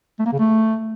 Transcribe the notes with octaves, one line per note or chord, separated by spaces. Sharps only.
A3
A#3
C#3
A3